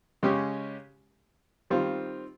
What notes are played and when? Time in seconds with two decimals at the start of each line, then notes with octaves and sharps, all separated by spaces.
0.23 C#3 G#3 C#4 G4
1.70 D#3 G3 C4 F4